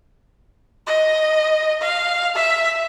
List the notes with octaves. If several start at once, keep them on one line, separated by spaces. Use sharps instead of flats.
D#5
F5
E5